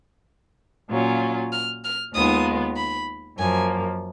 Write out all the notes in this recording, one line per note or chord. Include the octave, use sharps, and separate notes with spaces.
A#2 F#3 C#4 F4
F6
F6
D#2 D#3 G#3 B3 F4 D#6
B5
F#2 F3 A#3 G#5